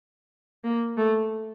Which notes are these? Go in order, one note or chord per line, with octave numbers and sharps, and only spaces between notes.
A#3
A3